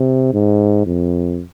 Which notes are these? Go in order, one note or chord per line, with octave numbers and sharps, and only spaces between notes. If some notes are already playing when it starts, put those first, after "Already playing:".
Already playing: C3
G#2
F2